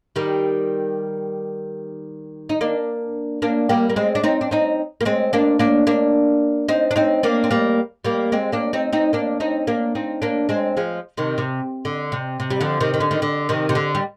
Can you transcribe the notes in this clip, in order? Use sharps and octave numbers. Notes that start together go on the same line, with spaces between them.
D#3 G3
D#4
A#3 D4
A#3 D4
G3 A#3
A#3
G#3 C4
D4
C4 D#4
D4
C4 D#4
A#3
G#3 C4
A#3 D4
A#3 D4
A#3 D4
C4 D#4
D4
C4 D#4
A#3 D4
C4
G3 A#3
G3 A#3
G#3 C4
A#3 D4
C4 D#4
C4 D#4
A#3 D4
C4 D#4
A#3 D4
C4 D#4
A#3 D4
G#3 C4
F3 G#3
C3 D#3
C3
D3
C3
C3
G3
D3 F3
C3 D#3
D#3
D3
D#3
D3
C3 D#3
C3
D3
G3